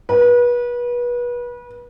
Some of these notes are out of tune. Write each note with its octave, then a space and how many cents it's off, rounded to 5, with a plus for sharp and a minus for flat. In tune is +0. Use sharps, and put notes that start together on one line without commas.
B4 -30